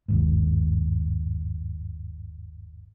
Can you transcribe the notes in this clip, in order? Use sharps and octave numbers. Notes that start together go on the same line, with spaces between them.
G1 D#2 G#2